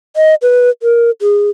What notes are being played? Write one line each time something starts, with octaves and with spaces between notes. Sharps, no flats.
D#5
B4
A#4
G#4